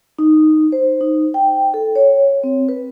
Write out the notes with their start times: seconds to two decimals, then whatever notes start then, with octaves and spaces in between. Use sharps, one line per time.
0.19 D#4
0.72 C5
1.01 D#4
1.34 G5
1.74 A4
1.96 C#5
2.44 C4
2.69 B4